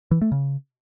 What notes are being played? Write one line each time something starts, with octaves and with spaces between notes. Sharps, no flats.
E3
A3
C#3